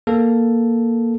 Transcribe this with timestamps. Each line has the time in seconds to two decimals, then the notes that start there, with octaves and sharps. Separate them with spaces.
0.07 A#3 A4